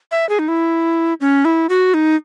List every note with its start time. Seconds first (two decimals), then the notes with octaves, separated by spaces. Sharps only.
0.11 E5
0.29 G#4
0.39 D#4
0.48 E4
1.21 C#4
1.45 E4
1.69 F#4
1.94 D#4